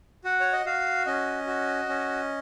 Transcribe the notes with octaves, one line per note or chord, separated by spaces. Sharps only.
F#4 F#5
C#5
D#5
F#4 F5
C#4 D#5
F#4
C#4